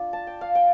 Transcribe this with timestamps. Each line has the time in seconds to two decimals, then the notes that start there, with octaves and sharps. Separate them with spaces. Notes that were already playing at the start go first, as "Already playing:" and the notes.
Already playing: D4 F4
0.13 A5
0.27 G5
0.41 F5
0.55 G5